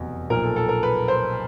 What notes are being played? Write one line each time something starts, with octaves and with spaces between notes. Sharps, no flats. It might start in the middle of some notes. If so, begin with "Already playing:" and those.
Already playing: F1 E2 B2 F#3
B1 A#2 F3 A#4
A4
A4
A#4
B4
C5